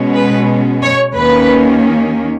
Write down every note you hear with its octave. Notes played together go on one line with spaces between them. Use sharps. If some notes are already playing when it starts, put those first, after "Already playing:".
Already playing: B2 G#3 C#4
B4
C#5
D#2 D#3 A#3 C#4 B4